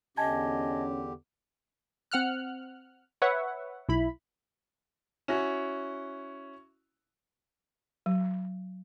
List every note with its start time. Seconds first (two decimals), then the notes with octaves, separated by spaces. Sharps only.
0.17 E2 D3 C#4 G4 D#5 G#5 A5 G#6
2.12 C4 F#5 F6 F#6
3.22 B4 C#5 E5 F#5
3.89 B1 E4 B5
5.28 C#4 E4 F#4
8.06 F#3